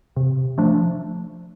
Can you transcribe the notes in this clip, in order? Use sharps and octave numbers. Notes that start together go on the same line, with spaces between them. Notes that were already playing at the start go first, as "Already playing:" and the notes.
C3
F3 A3 D4